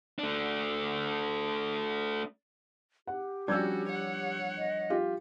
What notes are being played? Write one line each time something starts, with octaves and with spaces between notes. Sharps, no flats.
A3 D4
G4 F#5
F3 G3 C#4 D4 F#4 E6 G6 G#6
C#5 F#5
D#5
F4 G4